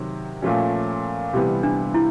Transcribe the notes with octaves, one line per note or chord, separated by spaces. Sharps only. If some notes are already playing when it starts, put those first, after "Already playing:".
Already playing: C3 D#3 F#3
A#2 F3 A3 C#4
C3 E3 G3 B3
D4
E4